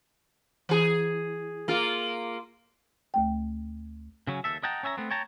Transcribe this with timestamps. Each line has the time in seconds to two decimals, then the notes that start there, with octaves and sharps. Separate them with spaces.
0.69 E3 G#4
1.68 A#3 F4
3.14 D2 A3 G5
4.27 C#3 F#3 C#4
4.44 D#2 A4 E5
4.63 D#5 F#5 G5 A5 A#5
4.83 C#4 C#5 E5 G#5 A#5
4.97 A3 B3 C4
5.11 C#5 G5 A5 A#5